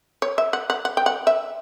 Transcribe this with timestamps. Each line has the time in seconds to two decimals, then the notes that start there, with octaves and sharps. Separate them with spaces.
0.22 C#5
0.38 E5
0.53 F#5
0.70 F#5
0.85 F#5
0.97 G5
1.06 F#5
1.27 E5